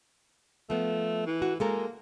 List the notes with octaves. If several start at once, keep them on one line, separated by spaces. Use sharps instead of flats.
F3 A3 B3
E3
F#4
G#3 A#3 A4 A#4